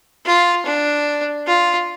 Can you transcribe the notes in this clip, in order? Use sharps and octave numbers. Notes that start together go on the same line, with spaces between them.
F4
D4
F4